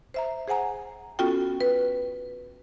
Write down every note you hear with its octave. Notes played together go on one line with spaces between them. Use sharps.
C5 E5 A#5
G#4 C5 F#5 G#5 A#5
B3 C#4 F4 F#4 A4 G5
B4